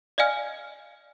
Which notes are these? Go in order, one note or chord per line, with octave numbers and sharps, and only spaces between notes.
D5 D#5 F5 G#5 F6